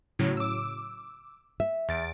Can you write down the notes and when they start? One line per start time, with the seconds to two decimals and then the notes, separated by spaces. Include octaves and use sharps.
0.19 A2 C#3 F#3
0.37 D6 E6
1.60 E5
1.89 E2 A6 D7